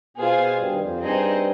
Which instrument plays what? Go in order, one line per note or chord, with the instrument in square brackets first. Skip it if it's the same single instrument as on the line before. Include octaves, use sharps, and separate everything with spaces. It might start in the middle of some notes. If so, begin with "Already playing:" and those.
[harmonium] B2 B3 [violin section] F4 G#4 C5 F5 G#5
[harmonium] B2 B3
G2 G3
D#3
F2 F3
[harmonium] G2 G3 [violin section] C4 D#4 G#4 C5 D#5